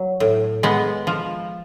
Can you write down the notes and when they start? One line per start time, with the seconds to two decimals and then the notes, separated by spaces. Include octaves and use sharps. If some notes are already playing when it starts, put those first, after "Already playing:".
Already playing: F#3
0.20 A2
0.63 G#3 B3
1.07 F3